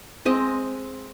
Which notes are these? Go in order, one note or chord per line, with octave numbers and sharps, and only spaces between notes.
G#3 C4 D#5